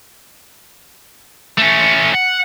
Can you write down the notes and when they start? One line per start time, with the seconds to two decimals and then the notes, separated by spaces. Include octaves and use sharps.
1.58 A3 C#4
2.15 F#5